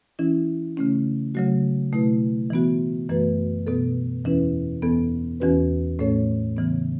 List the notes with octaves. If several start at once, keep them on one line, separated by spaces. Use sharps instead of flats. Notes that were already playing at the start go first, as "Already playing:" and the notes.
E3 C#4 E4
C#3 A3 C#4
C#3 F#3 A3 F#4
B2 A3 E4 B4
E3 B3 F#4
F#2 E3 A3 F#4 B4
B2 B3 A4
E2 E3 C#4 E4 B4
E2 E3 B3 A4
E2 E3 C#4 F#4 B4
A2 A3 C#4 A4 C#5
C#3 E3 B3